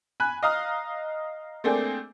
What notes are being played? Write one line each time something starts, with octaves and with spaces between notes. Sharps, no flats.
G#5 B5 F#6
D#5 F5 A#5 D#6 F6
A3 A#3 C4 D4 G#4